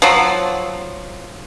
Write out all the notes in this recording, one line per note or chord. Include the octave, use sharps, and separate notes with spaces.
F3 F#3